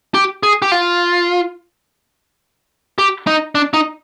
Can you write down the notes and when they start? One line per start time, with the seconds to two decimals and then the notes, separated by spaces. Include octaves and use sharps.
0.14 G4
0.43 G#4
0.62 G4
0.72 F4
2.98 G4
3.27 D#4
3.55 D4
3.74 D#4